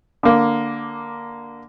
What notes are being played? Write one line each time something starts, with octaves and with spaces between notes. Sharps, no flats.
D3 A#3